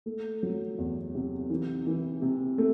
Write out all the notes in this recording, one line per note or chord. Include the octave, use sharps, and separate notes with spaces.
A3
F#3
E2
C3
E3
E3
C3
A3